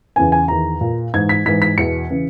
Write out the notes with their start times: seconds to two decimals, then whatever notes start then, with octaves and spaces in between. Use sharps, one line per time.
0.16 E2 C#3 E3 G#5
0.32 G#5
0.48 E2 D#3 A#5
0.81 A#2
1.14 G#2 E3 G#6
1.29 B6
1.45 G#2 E3 B6
1.62 B6
1.77 E2 B2 C#7
2.10 C#3 E3